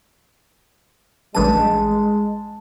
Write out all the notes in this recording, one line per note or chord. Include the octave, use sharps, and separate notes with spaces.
A1 G2 G#3 A5 D#7